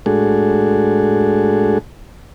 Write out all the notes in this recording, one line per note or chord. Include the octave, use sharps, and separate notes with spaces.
A2 G#3 D4 F#4 G#4 A4